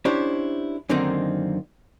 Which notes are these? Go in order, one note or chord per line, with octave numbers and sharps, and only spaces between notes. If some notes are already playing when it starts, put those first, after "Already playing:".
C#4 D4 E4 G4 C5
F#2 D3 D#3 A#3 C4 D#4